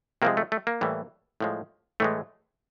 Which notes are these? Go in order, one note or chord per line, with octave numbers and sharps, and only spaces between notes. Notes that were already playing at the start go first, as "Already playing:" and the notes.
C3 F3 G#3 A#3
A3
A3
A#3
A2 E3 G3
A2 F3 G#3
A2 E3 G#3 A3